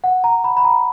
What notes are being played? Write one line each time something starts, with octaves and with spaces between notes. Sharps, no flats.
F#5
A#5
B5
B5
A#5